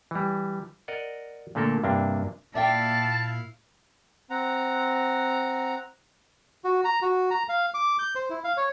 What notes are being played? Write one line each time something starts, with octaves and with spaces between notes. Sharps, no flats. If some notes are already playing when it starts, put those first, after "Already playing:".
E3 G3
A#4 D5 D#5 F#5
A#2 D3 A3 A#3 A4 A#4
G2 C3 A#3 D4
A#2 E4 D5 E5 F5 G5 A5
C4 F#5 A#5
F#4
A#5
F#4
A#5
F5
D6
G6
C5
E4
F5
C#5